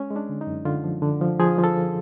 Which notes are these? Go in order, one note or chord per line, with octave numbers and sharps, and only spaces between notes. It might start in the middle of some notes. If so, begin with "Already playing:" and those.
Already playing: G#3 C#4
G#3
D4
D3
D#4
F#2
D3 F4
F3
D3
F3
F3 G#4
F3 A4